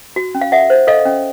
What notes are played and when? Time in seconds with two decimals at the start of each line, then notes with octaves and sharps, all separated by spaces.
0.16 F#4
0.35 C#4
0.41 F5
0.52 A4 E5 F#5
0.70 C5
0.87 A4 D#5 F5
1.05 C#4